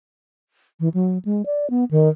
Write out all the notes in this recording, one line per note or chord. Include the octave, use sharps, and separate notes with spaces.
E3
F#3
G#3
D5
B3
D#3